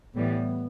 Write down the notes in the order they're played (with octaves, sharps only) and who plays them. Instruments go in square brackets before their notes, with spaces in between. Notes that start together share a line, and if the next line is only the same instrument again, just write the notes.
[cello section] A2 E3 G3 [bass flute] B3